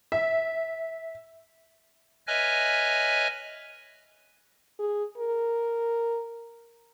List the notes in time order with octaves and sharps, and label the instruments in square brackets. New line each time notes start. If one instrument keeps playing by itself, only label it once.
[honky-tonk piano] E5
[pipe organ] B4 C#5 D#5 E5 G#5 F6
[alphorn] G#4
A#4